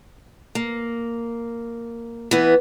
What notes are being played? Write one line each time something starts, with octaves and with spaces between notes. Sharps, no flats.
A#3
E3 B3